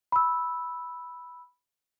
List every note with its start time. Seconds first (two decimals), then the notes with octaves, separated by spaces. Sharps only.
0.12 B5 E6